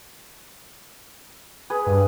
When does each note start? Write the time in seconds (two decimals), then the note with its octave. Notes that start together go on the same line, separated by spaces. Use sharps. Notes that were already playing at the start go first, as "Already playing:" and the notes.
1.70 G#4 B4
1.87 G2